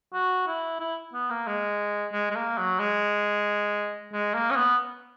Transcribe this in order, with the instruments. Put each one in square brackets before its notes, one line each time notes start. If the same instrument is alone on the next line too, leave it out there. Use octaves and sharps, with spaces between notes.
[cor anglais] F#4
E4
E4
B3
A#3
G#3
G#3
G#3
A#3
F#3
G#3
G#3
A#3
C#4
B3